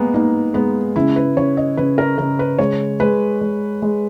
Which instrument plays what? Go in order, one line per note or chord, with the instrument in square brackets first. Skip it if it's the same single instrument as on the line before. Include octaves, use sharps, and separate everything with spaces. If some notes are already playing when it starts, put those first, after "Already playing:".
Already playing: [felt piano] G#3 A#3 B3
[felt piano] A#3 [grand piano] D#4
[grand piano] G#3 [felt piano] B3
[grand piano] C#3 [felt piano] E4
[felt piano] B4
[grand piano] C#3 [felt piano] C#5
[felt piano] D#5
[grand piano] C#3 [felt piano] B4
[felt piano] A#4
[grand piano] C#3 [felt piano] A#4
[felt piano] B4
[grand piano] G#3 [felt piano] C#5
[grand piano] G#3 [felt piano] B4
[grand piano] G#3
G#3